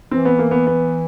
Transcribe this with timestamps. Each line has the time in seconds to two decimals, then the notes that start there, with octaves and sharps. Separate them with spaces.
0.11 E3 C4
0.25 B3
0.39 A#3
0.51 B3
0.67 B3